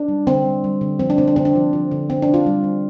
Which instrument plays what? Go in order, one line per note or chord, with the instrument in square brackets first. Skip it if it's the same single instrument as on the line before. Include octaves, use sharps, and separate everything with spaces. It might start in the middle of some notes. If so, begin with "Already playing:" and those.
Already playing: [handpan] D4
G3
D3 C4
G3
G3
D3
F3 C4
D4
D3 C4
D4
D3 C4
D4
F3
F3
D3
D3 C4
D4
D3
F4
G3
G3